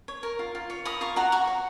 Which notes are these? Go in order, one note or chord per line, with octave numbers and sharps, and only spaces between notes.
C#5
A#4
F4
F4
C#5
A#4 B5 D#6
F4 A#5 C#6
F#4 F#5 A#5
F#4 A#5 C#6
C#5